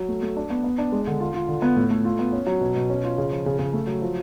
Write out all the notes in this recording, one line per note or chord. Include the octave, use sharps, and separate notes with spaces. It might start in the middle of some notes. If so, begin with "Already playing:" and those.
Already playing: F#3
A3
A3
D4
B3
B3
D4
G#3
D3
F4
F4
D3
B3
A2
A3
F4
B3
C#4
F#3
B2
B2
C#4
F4
C#3
F3
C#3
C#3
A3
F#3
F3